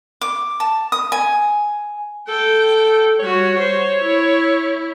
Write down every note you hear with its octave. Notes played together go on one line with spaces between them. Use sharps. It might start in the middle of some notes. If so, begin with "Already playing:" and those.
D6
A5
D#6
G#5
A4 G5
G3 F#4 C#5
C5
E4